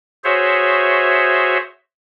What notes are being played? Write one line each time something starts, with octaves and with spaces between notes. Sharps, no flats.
F#4 G#4 C5 C#5 E5